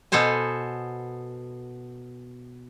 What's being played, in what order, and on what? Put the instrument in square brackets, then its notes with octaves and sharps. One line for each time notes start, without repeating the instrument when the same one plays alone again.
[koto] B2 B3 A4 C5 G#5